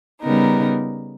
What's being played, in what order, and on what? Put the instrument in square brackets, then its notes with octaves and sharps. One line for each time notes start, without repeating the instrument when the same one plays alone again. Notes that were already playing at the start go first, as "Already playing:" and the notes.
[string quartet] C#3 G3 B3 D#4 A#4